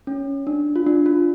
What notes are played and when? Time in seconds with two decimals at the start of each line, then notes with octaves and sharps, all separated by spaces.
0.07 C#4
0.47 D4
0.76 F4
0.87 D4
1.06 F4